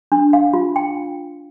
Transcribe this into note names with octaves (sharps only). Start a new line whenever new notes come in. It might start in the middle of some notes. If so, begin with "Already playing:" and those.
D4
F5
F4
G5